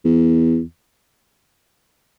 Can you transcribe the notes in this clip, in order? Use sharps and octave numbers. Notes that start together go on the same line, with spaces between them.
E2